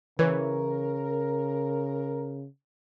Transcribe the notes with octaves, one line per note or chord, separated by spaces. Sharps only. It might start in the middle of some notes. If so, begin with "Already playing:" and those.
C#3 E3 A#4 B4 C#5